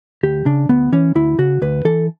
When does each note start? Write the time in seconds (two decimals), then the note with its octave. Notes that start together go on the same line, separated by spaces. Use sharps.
0.23 D2 G4
0.46 C#3 D4
0.69 D2 B3
0.92 E3 C#4
1.15 D2 E4
1.38 C#3 F#4
1.62 D2 B4
1.85 E3 A4